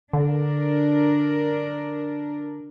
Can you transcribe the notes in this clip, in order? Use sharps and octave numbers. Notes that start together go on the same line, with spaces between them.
D3 D4 A#4